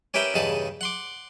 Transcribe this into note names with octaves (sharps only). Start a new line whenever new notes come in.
C#4 G4 A#4 B4 E5 G5
E2 G2 C#3 D#4 A5 B5
F#5 C6 D6